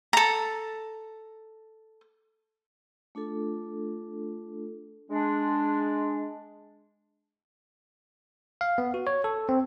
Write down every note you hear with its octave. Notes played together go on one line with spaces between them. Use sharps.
A4 A#5
A3 D4 F4 A4
G#3 D4
F5
B3
F#4
C#5
A4
C4